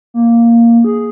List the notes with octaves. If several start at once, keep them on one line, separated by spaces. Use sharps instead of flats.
A#3
G#4